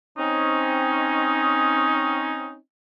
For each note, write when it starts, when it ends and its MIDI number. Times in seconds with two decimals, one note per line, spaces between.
0.18 2.56 60
0.18 2.56 61
0.18 2.56 63